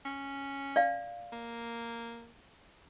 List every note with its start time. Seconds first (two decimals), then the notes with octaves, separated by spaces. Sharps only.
0.06 C#4
0.76 D5 F5
1.32 A#3